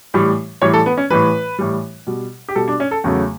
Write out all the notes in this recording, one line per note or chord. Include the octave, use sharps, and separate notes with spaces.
A2 E3 G3
A2 E3 G3 C#5
A4
B3
C#4
A2 E3 G3 B4
A2 E3 G3
B2 G3
G4
B2 G3 A4
D4
C#4
A4
E2 C#3 F#3 A3